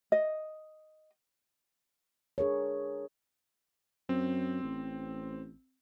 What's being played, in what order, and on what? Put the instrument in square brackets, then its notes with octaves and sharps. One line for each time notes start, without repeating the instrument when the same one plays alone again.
[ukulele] D#5
[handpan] D4 G#4 A#4 C#5
[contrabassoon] F#2 [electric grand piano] C4
[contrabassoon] A1